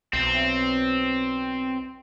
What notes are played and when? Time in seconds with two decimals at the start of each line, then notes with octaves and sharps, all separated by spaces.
0.13 B1 C4